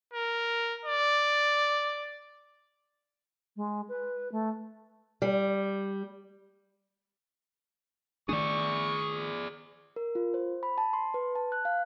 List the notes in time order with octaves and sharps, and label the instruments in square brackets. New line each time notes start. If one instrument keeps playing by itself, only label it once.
[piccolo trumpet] A#4
D5
[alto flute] G#3
B4
A3
[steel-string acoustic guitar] G3
[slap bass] D#3 A3 D4 [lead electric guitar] G#4 D5 [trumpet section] C#6
[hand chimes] A#4
F4
C5
B5
A5
C6
B4
A5
F#6
F5